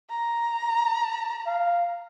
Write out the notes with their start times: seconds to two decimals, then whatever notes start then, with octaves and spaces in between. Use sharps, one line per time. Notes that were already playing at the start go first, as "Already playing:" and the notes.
0.10 A#5
1.47 F5